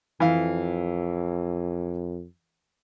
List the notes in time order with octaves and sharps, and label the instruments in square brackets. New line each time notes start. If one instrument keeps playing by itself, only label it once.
[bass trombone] F2 [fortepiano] E3 F5